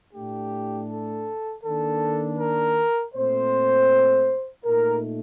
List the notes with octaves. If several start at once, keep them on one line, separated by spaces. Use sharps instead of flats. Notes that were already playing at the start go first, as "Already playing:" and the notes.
A2 A3 D4 G4
A4
D#3 A#3 D4 A4
A#4
A#2 A3 C4 C5
A#2 A3 D#4 A#4